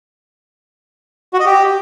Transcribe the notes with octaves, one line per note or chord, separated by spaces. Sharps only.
F#4
D#5
G4